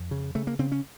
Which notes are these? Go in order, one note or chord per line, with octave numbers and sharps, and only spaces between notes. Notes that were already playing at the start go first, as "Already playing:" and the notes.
Already playing: F2
C#3
C#3 A3
A#3
C#3 C4
C#4